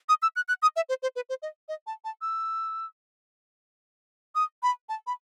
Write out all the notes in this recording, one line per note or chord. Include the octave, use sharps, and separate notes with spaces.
D#6
E6
F#6
F#6
D#6
E5
C5
C5
B4
C5
D#5
D#5
A5
A5
E6
D#6
B5
A5
B5